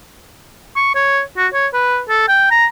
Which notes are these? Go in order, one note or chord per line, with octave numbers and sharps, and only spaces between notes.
C#6
C#5
F#4
C#5
B4
A4
G5
A#5